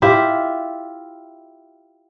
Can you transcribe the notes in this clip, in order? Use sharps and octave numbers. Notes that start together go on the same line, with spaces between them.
E4 F4 G4 E5